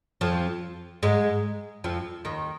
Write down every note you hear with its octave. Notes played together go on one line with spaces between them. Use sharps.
F2 F3
G#2 G#3
F2 F3
D#2 D#3